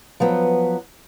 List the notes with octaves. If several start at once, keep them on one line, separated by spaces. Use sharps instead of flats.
F3 F#3 B3